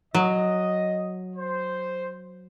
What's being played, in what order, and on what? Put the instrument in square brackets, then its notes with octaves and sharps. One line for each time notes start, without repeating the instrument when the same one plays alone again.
[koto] F#3 [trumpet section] D#5
[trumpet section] C5